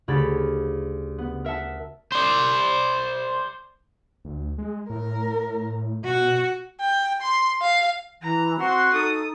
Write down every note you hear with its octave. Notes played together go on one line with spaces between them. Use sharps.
D2 C#3 G4 B5 G#6 A6
B3
A#4 E5 F#5 A5
C5 D5
D2
G#3
A2 A#4
B2 F#4
G5
C6
F5
E3 A#5
C4 F#4 F#5 C6
D#4 A4 D#6